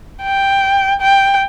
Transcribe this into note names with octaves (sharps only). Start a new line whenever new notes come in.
G5
G5